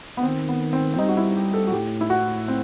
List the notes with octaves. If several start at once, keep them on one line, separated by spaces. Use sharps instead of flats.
B3
D#3 C4
B3
C4
C4
G3 D#4
F#4
E4
G4
A4
F#4
A2 G4
E4
F#4
C4